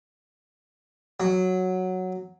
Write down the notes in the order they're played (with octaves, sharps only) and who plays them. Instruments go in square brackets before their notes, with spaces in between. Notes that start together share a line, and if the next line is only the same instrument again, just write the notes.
[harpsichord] F#3